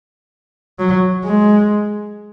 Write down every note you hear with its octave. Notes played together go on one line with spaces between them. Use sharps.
F#3
G#3